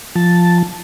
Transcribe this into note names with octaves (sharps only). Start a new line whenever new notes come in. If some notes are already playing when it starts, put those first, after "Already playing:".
F3 A5